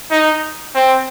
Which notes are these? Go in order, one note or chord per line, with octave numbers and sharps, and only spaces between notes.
D#4
C4